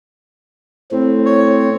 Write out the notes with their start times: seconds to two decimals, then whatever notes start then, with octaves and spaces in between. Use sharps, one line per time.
0.92 A2 C4
1.26 C#5